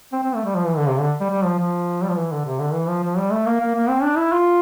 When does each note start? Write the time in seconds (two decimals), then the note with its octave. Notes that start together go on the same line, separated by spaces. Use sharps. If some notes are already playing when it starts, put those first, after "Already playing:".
0.13 C4
0.23 C4
0.35 A3
0.45 G3
0.55 F3
0.66 E3
0.78 D3
0.88 C3
0.99 D3
1.21 G3
1.31 G3
1.45 F3
1.59 F3
2.03 G3
2.10 F3
2.16 E3
2.32 D3
2.46 C3
2.59 D3
2.74 E3
2.88 F3
3.03 F3
3.18 G3
3.32 A3
3.46 A#3
3.60 A#3
3.75 A#3
3.89 C4
4.03 D4
4.17 E4
4.32 F4